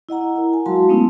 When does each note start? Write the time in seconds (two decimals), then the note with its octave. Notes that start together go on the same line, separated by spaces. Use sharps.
0.09 E4 D#5 F#5 A#5
0.36 E4 A#4
0.53 G#5
0.66 F#3 G#3 F#4 F5 A5 C6
0.88 G#3 A3 B3 C#4 D#4 E4